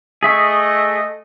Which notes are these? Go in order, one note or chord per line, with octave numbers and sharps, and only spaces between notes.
A3 G#4 D#5 E5 C#6